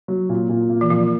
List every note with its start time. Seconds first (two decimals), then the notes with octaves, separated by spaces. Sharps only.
0.08 F#3
0.29 A#2
0.49 A#2
0.69 A#3
0.81 E3
0.90 A#2 F3